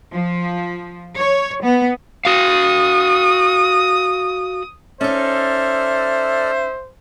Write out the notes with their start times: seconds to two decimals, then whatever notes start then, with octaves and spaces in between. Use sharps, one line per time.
0.13 F3
1.16 C#5
1.62 B3
2.25 F#4 F5 D#6
5.01 C#4 D#4 A4 C5 D5 E5 F6